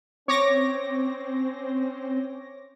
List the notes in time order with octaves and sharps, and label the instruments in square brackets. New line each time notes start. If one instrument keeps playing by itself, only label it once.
[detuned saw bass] C4 [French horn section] C#4 C5 [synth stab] C#5 D6 A#6